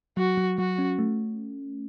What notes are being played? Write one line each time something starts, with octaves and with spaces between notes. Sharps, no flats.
F#3 F#4
F#3
F#3 F#4
C#4
A3